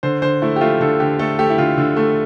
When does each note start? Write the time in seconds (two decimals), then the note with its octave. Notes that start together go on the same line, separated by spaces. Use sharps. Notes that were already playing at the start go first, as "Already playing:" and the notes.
0.03 D3 C5
0.22 D3 C5
0.42 A3 E4
0.56 G4
0.61 A3 F4
0.81 D3 A4
1.00 D3 G4
1.19 A3 A4
1.39 A3 G4
1.50 E4
1.58 D3 F4
1.78 D3
1.96 A3